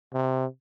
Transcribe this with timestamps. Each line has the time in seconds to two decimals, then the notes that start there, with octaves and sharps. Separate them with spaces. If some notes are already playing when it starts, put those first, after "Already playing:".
0.14 C3